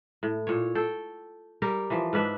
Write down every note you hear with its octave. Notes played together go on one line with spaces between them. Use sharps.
A2
A#2 C#5
A4 G5
G3 G4 A#4
E3 F3
G#2 D4 B4 E5